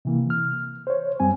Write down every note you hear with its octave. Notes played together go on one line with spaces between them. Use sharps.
C3 E3 A#3
F6
C5 C#5
F#2 G3 C4 G#5